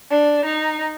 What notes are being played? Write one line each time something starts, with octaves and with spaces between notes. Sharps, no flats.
D4
D#4